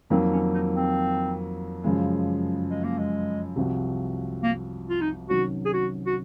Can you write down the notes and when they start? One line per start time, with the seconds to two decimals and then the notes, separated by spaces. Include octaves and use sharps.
0.10 F2 D#3 F#3 A#3 C4
0.32 C#4
0.54 D#4
0.75 C4
1.84 F#2 C#3 F3 G#3
2.70 G#3
2.84 A#3
2.98 G#3
3.56 C2 C3 F3 C4 F#4
4.43 A#3
4.89 F4
5.01 D#4
5.29 C3 D#3 F#3 C#4 F#4
5.65 G#4
5.73 F#4
6.06 F#4